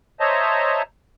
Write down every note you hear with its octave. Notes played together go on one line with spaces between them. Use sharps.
C5 C#5 D#5 E5 A5 A#5